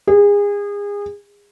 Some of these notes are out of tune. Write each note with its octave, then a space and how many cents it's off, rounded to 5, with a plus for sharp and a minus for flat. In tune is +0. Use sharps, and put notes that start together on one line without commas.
G#4 -30